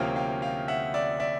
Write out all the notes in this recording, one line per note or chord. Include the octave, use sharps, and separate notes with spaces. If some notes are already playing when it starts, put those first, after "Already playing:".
Already playing: D2 C3 F3 A#3 C#4 F5 G5
F5 G5
F5 G5
E5 F#5
D5 E5
D5 E5